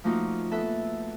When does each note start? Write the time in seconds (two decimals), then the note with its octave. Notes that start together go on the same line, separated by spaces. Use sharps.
0.04 F3 A3 A#3 D#4 F4 F#4
0.51 B3 A4 E5 F#6